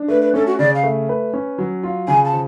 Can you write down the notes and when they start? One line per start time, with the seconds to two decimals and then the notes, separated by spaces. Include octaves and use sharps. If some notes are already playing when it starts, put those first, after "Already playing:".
Already playing: D4
0.08 A3 B4
0.21 B4
0.34 C#4 A4
0.47 F#4
0.59 C#3 D5
0.75 F5
0.84 A3
1.09 B4
1.33 C#4
1.58 F#3
1.83 F4
2.08 C#3 G#5
2.25 A5
2.33 F3